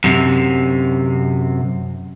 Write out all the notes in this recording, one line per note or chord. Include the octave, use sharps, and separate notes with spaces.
F#2 C3